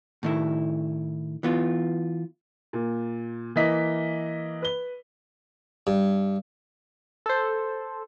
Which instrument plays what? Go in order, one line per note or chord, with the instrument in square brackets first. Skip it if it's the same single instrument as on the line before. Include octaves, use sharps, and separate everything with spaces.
[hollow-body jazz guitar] A2 D#3 E4
E3 B3 F4
[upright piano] A#2
E3 A#3 D#5 B6
B4 G7
[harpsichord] G2
[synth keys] A4 C5